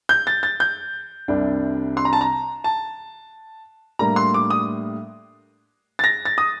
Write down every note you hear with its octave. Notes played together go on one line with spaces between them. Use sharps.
G6
A6
A6
G6
C2 C3 G3 D4
C6
A#5
A5
A#5
A5
A2 G3 A#3 D4 A#5
C6
D6
D#6
A6
A#6
A6
D#6